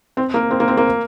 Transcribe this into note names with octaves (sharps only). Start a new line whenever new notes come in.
C4
A#3
C4
A#3
C4
A#3